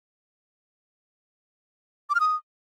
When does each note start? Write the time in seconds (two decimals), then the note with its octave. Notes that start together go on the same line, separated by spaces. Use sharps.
2.10 D6
2.15 F6
2.20 D#6